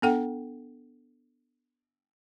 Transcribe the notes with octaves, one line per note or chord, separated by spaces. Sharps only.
B3 D4 A4 F#5 G5